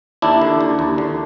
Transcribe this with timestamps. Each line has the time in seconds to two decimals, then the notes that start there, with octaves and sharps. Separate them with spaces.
0.22 D#2 D4 E4
0.41 D3
0.61 D#2
0.79 D#2
0.98 D3